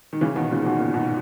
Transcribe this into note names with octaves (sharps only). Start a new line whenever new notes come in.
D#3
C#3 E3
B2 D#3
A#2 C#3
B2
A#2
G#2 B2